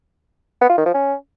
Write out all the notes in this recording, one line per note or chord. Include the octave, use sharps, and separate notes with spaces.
B3
F4
D#3
F3
C#4